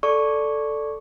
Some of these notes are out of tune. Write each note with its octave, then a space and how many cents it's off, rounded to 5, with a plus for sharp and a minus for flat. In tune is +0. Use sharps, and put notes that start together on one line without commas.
A4 +0 D5 +0 C#6 +0